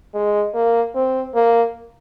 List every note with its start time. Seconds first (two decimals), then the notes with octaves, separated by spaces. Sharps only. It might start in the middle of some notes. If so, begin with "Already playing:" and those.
0.14 G#3
0.54 A#3
0.95 C4
1.35 A#3